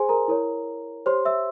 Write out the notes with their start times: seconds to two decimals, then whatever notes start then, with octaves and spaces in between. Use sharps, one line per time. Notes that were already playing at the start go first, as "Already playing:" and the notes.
Already playing: G#4 C5 G#5 C6
0.09 A#4 A#5
0.28 E4 A#4 C#5
1.06 G4 C5 C#5 C6
1.25 E5 E6